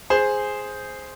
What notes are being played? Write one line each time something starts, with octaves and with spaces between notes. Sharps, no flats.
G#4 C5